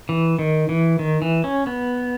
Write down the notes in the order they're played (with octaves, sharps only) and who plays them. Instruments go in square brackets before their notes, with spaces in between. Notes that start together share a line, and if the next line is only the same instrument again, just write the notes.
[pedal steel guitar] E3
D#3
E3
D#3
E3
C#4
B3